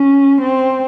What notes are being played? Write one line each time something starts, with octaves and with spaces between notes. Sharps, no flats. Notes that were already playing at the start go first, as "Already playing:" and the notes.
Already playing: C#4
C4